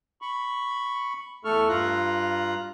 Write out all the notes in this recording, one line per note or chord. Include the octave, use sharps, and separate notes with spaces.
B5 C#6
E2 A3 A4 C#6 F6
G2 F4 A#5 F#6